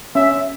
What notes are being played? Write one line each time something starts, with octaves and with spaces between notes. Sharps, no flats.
C#4 E5